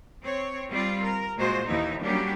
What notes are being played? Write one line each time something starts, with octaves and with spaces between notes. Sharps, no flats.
C4 C#5
G3 C4 F4 D5
A#4
A#2 G#3 F4 F#4 C5
D#2 E3 D#4 E4
F#3 G3 A#3 C#4 D4 G4